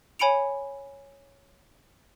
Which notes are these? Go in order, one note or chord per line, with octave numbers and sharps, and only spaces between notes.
C#5 G#5 B5 C#7 D7 F7